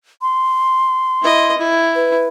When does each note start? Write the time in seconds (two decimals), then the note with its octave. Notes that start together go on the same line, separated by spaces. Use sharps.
0.22 C6
1.23 E4 D#5
1.57 E4
1.95 B4